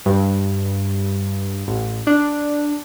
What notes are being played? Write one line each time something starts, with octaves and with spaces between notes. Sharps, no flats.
G2
A1
D4